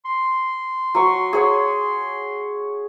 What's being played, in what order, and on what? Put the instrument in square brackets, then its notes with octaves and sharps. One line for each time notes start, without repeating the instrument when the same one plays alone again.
[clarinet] C6
[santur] F#3 C#6
G#4 C#5 F#5